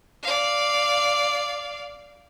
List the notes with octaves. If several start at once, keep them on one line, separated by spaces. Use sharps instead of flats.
D5 F5